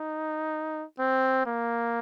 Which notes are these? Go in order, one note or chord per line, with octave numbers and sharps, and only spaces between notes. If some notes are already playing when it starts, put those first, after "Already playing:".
Already playing: D#4
C4
A#3